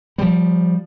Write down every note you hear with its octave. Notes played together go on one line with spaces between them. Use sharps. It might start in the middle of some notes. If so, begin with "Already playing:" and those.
F3 G3